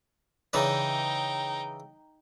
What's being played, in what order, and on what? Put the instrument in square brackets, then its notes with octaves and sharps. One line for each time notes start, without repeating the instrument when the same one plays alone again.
[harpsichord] C#3 E3 D5 [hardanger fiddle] D#4 G5